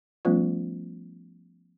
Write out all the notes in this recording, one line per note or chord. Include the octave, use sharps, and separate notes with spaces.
F3 G3 A3 B3 C#4 F4